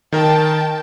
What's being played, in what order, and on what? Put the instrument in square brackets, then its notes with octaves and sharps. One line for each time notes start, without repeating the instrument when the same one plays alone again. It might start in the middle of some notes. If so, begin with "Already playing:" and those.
[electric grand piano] D#3 A#4 [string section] G5 A5